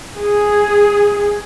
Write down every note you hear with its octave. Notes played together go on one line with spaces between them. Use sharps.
G#4